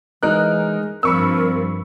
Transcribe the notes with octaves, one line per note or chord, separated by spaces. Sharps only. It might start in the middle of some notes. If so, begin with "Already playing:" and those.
E3 G#3 D#4 A#4 F#6
G2 F3 C4 A#4 B5 C#6 E6